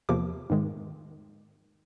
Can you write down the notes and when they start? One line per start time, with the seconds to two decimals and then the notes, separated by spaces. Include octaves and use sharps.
0.09 E2 C3 F3 A#3 D6
0.50 G#2 D#3 G#3